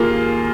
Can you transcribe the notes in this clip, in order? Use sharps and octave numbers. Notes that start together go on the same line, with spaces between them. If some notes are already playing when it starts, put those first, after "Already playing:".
Already playing: D#2 A#3 F4 G#4